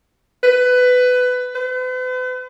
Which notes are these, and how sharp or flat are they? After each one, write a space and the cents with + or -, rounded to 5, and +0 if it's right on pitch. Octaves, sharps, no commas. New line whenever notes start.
B4 +15
B4 +45